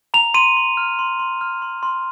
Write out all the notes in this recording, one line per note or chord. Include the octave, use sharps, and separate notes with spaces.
A#5 F7
C6 D#7
C6
F6
C6
C6
F6
C6
C6